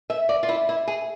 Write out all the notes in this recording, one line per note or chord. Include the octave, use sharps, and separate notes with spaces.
E5
D5
F4
E4
E4
G#4